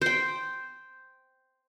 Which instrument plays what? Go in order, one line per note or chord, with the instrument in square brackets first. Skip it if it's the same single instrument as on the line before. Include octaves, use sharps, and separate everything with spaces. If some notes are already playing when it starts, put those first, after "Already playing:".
[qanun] C5 G5